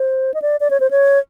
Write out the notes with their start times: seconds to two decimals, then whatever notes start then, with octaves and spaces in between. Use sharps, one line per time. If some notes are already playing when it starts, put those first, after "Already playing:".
Already playing: C5
0.34 D#5
0.42 D5
0.60 D5
0.70 C#5
0.80 C5
0.91 C#5